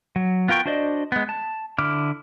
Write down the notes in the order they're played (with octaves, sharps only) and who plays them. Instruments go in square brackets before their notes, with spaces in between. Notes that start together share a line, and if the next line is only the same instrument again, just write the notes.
[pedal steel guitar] F#3
B3 F4 A#4 G5 C#6
D4 F#4 C5 D5 D#5
G#3 B3
A5
D3 E4 D6 F6